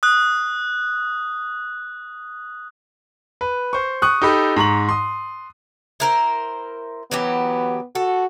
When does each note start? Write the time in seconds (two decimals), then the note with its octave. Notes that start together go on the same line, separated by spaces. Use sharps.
0.03 D#6 F#6
3.41 B4
3.73 C5 C#6
4.02 C#6 D#6 F#6
4.22 D#4 G4 A4 B5
4.56 G#2 A#5 C#6 F#7
4.89 C6 D#6
6.00 E4 A#4 C5
7.11 E3 F#3 B3 G4
7.95 F#4 A4